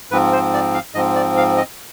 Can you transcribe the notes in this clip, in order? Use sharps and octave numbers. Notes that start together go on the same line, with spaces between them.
G#2 F3 C4 B4
C5
D5
F5
G#2 F3 C4 D#5
D5
F5
D#5